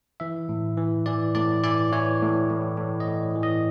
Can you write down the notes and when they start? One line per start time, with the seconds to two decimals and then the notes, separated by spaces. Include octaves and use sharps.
0.20 E3 E5
0.49 A2
0.77 E3
1.06 E3 D5
1.35 A2 D5
1.63 E3 D5
1.92 E3 C#5
2.22 A2
2.50 A2
2.78 A2
3.00 D#5
3.07 A2
3.36 E3
3.43 D#5